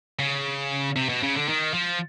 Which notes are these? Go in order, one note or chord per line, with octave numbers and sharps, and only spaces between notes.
C#3
C3
B2
C#3
D3
D#3
F3